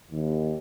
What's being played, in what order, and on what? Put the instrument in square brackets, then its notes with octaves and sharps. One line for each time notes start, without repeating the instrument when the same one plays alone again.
[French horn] D#2